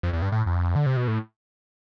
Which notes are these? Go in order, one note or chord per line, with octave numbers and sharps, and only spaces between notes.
F2
E2
G2
A2
F2
D3
C3
B2
A2